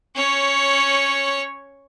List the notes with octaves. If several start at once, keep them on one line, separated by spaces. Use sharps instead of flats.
C#4 C#5